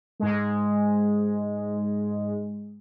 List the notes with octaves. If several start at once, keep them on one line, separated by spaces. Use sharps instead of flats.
G#2 G#3